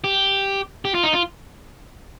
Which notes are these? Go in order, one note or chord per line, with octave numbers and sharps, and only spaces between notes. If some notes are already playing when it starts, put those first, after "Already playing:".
G4
G4
F4
D#4
F4